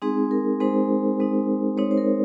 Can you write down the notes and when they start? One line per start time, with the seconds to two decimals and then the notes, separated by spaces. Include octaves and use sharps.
0.02 G#3 C4 D#4 G#4
0.31 A#4
0.60 G#3 C4 D#4 C5
1.20 G#3 C4 D#4
1.77 G#3 C4 D#4 C#5
1.91 C5
1.98 A#4